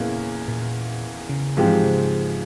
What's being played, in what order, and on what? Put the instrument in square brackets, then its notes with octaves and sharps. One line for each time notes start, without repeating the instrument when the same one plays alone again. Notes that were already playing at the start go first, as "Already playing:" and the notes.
Already playing: [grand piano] E2 C#3 E3 A#3 [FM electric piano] A#2
[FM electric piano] A#2
C#3
[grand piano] G#2 F3 G#3 C4 G4 [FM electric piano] E3
[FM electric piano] C#3